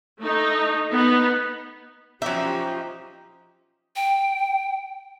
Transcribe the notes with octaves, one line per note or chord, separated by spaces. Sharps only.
A3 D#4
B3 D#4
F3 F#3 C#4 D#4 F4 G4 E5
G5